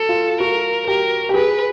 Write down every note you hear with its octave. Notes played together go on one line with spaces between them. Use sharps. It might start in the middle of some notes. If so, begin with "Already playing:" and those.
Already playing: F#4 A4
F4
F#4 A#4
G4 A#4
G4
G#4 B4